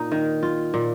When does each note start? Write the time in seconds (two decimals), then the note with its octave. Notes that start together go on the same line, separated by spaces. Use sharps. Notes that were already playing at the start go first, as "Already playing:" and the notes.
Already playing: A#2 D#4
0.12 D#3
0.43 F4
0.74 A#2